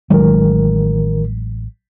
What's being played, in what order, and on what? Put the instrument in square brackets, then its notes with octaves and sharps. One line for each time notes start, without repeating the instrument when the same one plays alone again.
[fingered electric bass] A1 F#3 G#3 [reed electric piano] D#3 A#4